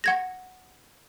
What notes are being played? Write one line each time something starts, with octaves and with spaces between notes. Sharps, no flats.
F#5 G#6 A#6